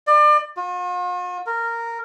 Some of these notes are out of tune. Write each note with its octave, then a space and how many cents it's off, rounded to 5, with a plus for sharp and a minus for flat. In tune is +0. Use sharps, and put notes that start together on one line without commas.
D5 +35
F4 +45
A#4 -10